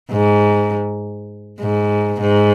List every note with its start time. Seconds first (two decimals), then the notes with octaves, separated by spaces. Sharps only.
0.11 G#2
1.61 G#2
2.21 G#2